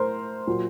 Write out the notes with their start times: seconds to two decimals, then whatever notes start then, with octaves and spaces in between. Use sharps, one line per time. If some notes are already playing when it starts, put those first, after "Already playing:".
Already playing: A2 A#4 C5
0.47 A#2 F#3